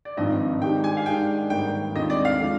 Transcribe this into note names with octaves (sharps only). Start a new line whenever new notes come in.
D5
G#1 G2 F3 C4 D#4 D#5
D#3 G#3 D4 G4 G5
G#5
F5
D#3 G#3 D4 G5
G#1 G2 D3 G3 A#3 G5
D#2 D3 G#3 C4 F4 D#5
D5
F5
D3 F3 G#3